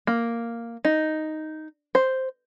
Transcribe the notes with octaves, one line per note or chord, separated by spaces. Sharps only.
A#3
D#4
C5